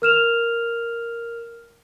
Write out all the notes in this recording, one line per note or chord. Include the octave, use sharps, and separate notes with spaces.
A#4 F6 E7 F7